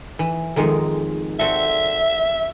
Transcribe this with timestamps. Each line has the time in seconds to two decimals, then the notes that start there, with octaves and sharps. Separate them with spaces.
0.19 E3
0.56 F2 D#3 G#3
1.39 C4 F#4 A4 E5